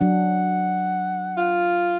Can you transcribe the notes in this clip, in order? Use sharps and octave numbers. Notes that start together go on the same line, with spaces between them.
F#3 D4 F#5
F4